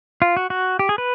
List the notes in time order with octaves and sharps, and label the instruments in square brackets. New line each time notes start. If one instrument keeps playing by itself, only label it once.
[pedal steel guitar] F4
F#4
F#4
G4
G#4
B4